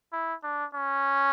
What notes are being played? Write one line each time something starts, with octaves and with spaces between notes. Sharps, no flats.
E4
D4
C#4